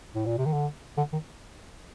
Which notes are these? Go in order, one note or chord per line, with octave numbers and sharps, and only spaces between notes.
A2
A#2
C3
D#3
D3
D3
D#3